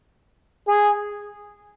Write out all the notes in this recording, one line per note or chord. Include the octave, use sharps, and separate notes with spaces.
G#4